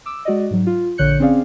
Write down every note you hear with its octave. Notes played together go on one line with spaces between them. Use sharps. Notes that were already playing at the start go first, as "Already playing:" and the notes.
D6 E6
G#3 F#4 D5 D#5
G#2 F#3
F4
A#1 D3 C#5 F#6 G6 C#7
C4 C#4 G#4 D5 F5